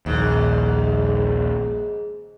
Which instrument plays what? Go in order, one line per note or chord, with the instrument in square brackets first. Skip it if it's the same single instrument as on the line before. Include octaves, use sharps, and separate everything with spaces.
[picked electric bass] A#1 D#2 [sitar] G#2